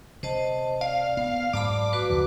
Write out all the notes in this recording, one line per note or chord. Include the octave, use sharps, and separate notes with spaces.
C3 C5 D#5 A5
D5 F5
B3 F5
G#2 F#3 D5 A5 B5 D6
F#4 B4
D#2 D3 D#3